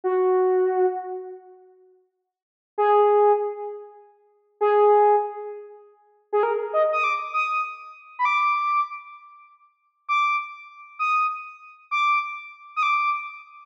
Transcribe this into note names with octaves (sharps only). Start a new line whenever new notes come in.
F#4
G#4
G#4
G#4
A#4
D#5
D#6
D6
D#6
B5
D6
D6
D#6
D6
D#6
D6